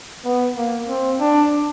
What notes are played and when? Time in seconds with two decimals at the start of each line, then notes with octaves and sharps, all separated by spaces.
0.25 B3
0.56 A#3
0.88 C4
1.20 D4